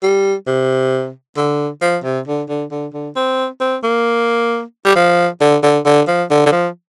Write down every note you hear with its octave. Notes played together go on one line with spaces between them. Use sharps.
G3
C3
D3
F3
C3
D3
D3
D3
D3
C4
C4
A#3
G3
F3
D3
D3
D3
F3
D3
D3
F3